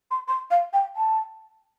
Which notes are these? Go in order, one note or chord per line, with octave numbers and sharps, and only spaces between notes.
C6
C6
F5
G5
A5